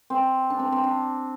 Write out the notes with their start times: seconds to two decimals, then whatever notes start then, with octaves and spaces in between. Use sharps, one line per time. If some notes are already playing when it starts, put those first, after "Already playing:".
0.10 C4
0.50 D4
0.59 C4
0.72 C4
0.84 D4